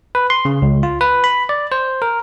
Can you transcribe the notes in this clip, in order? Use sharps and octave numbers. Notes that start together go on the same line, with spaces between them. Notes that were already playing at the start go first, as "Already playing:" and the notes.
B4
C6
C#3
C#2
F4
B4
B5
D5
C5
A#4